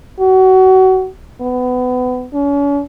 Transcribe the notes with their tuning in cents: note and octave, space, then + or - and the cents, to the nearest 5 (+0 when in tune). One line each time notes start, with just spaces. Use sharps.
F#4 +25
B3 +25
C#4 +40